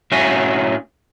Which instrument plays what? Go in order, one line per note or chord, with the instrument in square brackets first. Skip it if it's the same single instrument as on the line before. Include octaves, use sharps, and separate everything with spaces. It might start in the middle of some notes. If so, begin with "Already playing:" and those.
[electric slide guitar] A2 C#4 F#4 E5 F5 G#5